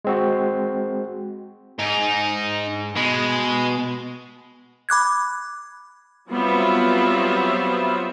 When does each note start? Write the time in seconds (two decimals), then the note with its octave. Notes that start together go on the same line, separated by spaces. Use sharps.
0.05 G#3 C4 F#4
1.79 G#2 D#4
2.96 B2 G#3
4.89 B5 D6 F#6 G#6
6.30 F#3 G3 B3 C4 F4 E5